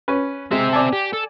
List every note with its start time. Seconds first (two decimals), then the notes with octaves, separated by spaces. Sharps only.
0.08 C#4 B4
0.51 G#3 C4 E5
0.73 D5 G#5 A5
0.93 G4
1.13 A4